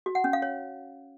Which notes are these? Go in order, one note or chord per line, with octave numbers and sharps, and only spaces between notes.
F#4
F#5
C#4
F5
C#5